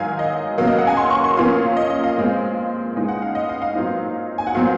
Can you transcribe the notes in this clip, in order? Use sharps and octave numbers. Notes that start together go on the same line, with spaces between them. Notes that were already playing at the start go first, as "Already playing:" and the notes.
Already playing: G#2 D#3 F#3 F5 G#5
D#5
C#3 F#3 A#3 F5
D#5
F#5
G#5
C6
C#6
C6
A#2 F3 A#3 C#4 F5
D#5
D#5
F5
A#2 G#3 C4
C#3 G#3 D#4
F#5
F5
D#5
F5
F5
A#2 F#3 C4 D#4
G#5
F#5
A#2 F#3 C4 F5